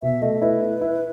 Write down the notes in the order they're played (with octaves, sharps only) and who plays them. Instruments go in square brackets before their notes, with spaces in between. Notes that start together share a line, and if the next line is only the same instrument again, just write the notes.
[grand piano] B2 [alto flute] E5
[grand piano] A3 [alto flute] D#5
[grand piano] E4 [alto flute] B4
[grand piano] E4
E4